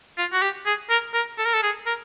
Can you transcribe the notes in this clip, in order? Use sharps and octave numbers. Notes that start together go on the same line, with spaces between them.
F4
F#4
G4
G#4
A#4
A#4
A4
A#4
A4
G#4
A#4